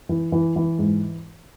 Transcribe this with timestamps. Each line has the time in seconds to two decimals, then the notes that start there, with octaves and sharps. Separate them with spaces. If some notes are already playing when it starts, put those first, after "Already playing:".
0.09 E3
0.32 E3
0.56 E3
0.79 G#2